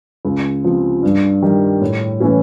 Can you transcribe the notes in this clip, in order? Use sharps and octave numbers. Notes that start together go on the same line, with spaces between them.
C#2
C3 F3
G2
D#3 G3
A2
E3 A3 C#4 E4